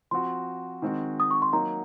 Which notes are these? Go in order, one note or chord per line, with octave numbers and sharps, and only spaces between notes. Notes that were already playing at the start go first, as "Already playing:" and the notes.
F3 C4 F#4 C6
D#3 G#3 C4 F#4
D#6
C#6
C6
F#3 A#3 D#4 F#4 A#5